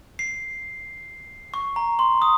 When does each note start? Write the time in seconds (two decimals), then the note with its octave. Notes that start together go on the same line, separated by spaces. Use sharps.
0.19 C7
1.54 C#6
1.76 A#5
1.99 C6
2.22 D#6